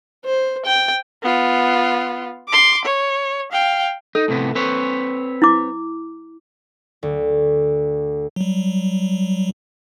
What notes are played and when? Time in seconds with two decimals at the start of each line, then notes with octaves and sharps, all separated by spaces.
0.25 C5
0.65 G5
1.23 B3 F4
2.49 C6 D6
2.85 C#5
3.52 F5 G5
4.15 D#4 A4
4.28 A2 C3 B3
4.55 C4 B4 C#5
5.42 E4 D6
7.03 D2
8.36 F#3 G3